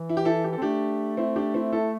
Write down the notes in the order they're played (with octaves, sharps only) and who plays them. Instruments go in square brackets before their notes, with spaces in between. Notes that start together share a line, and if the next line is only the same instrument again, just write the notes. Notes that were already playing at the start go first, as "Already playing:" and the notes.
Already playing: [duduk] E3
[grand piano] E4
G4
E4 A4
G4
A4
[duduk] C4
[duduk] A3 [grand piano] D4 G4
[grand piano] C4 E4
D4 G4
C4 E4
E4 A4